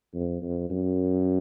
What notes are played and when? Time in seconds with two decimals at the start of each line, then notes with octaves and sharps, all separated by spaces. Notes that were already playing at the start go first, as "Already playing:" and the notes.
0.14 F2
0.42 F2
0.70 F#2